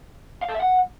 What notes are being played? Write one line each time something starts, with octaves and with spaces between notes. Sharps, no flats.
F5
A4
E5
F#5